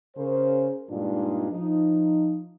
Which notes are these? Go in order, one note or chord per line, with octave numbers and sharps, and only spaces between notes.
C#3 A#4 C5
G2 A#2 G#3 D4 D#4 F4
F3 D#4